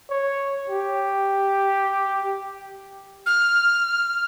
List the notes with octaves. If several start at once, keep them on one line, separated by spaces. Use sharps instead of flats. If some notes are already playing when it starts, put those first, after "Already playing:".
C#5
G4
F6